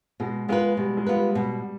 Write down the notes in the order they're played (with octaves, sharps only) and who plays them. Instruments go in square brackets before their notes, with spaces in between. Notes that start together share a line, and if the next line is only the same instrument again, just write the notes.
[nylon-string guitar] B2 [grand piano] G#3
[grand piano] G#3 [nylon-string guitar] B3 F4 B4
[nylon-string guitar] B2 [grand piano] G3
[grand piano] G#3
[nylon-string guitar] B3 F4 B4
[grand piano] G3
[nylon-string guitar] B2 [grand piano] G3